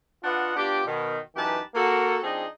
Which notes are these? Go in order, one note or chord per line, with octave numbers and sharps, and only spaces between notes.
D4 F4 B4 D#5 F#5
B3 D4 F4 G4
B2 D#3
F#2 E3 D#4 G4 B4 A5
A#3 F#4 A4
F3 C4 D4 D#4 G#4 D#5